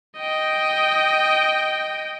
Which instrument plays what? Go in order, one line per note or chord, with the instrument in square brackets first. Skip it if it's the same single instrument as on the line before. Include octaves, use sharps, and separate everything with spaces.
[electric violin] D#5 G5